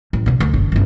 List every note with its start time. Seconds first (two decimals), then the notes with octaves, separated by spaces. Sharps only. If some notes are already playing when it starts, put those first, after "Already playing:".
0.13 A1
0.26 B2 D3
0.40 D2
0.54 F#1 D3
0.72 G1 C#3